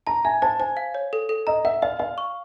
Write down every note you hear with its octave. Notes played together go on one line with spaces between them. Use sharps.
A5 A#5
E5 G#5
C5 A5
C5 G#5
F5
C#5
A4
A4
D#5 A#5
E5 F#5
D5 F5
D5 F5
C#6